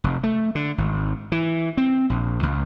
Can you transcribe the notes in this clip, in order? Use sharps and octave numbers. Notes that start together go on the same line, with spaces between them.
F1
A3
D3
G#1
E3
C4
A#1
C#2